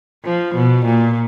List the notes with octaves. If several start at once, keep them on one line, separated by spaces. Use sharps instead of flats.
F3
B2
A#2